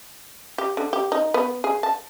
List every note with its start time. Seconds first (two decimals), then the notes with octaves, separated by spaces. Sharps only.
0.58 G4
0.77 D3
0.93 G4
1.12 D#4
1.34 B3
1.64 G#4
1.83 A5